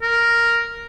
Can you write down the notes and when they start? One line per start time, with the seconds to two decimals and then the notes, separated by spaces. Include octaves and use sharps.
0.02 A#4